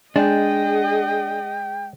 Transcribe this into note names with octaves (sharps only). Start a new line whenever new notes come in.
G#3 D4 G#4 D#5 G5